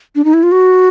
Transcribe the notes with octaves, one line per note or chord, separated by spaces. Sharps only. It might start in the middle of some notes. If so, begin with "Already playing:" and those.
D4
D#4
E4
F4
F#4